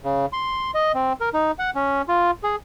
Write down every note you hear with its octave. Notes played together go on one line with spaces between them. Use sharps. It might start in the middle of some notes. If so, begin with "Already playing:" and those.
C#3
C6
D#5
C4
A#4
D#4
F#5
C#4
F4
G#4